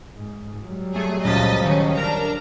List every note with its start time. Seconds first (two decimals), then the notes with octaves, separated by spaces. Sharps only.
0.16 G#2
0.65 F#3 G3
0.96 A3 G#4
1.25 C#2 A#2 F3 D#5 A6 B6
1.66 D#3 C#4
1.98 D4 A#4 A#5